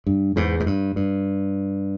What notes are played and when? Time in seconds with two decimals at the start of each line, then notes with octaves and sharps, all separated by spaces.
0.07 G2
0.36 E2 G#2
0.60 G#2
0.66 G2
0.96 G2